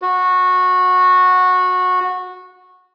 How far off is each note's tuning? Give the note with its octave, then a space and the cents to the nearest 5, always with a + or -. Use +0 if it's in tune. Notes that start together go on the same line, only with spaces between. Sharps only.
F#4 -15